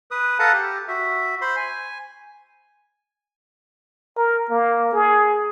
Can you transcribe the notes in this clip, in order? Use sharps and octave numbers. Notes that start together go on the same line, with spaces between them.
B4 D#6
A4 B4 F5 F#5 A5 A#5
G4
F#4 E5
C5 B5 C6
G#5
A#4
A#3
G#4